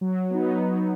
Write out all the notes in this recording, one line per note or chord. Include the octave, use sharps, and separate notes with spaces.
F#3
B3 D#4
F#3